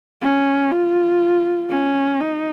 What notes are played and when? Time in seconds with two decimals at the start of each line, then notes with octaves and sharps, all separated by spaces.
0.22 C#4
0.71 F4
1.70 C#4
2.20 D#4